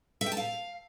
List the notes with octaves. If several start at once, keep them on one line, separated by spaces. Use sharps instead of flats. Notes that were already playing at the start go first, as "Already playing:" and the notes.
E5
G5
A5
F5